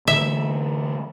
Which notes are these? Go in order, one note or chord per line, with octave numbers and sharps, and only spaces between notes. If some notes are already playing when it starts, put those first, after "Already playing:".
D3 E3 A3 E5